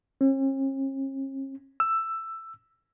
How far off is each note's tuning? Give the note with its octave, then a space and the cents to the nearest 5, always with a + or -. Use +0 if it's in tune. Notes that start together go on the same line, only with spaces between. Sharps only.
C#4 -45
E6 +10